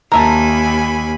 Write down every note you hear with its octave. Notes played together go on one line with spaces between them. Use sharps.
D#2 A#4 E5 G#5 A5 B5